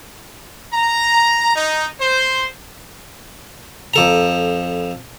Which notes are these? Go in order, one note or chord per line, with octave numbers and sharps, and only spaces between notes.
A#5
D#4
C5
F2 A4 A#5